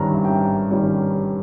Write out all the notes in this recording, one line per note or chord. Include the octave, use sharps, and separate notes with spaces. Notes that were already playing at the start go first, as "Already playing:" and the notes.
Already playing: G#1 G2 D#3 G3 C#4 A#5
E5
G#1 G5
G2 D#3 G3 C#4